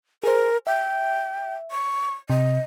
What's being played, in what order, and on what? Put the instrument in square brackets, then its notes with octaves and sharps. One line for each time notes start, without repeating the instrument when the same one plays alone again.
[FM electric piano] G#4 C5 [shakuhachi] A#4
[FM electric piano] E5 [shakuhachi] G5
[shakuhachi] C#6
[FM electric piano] C3 [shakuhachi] D#5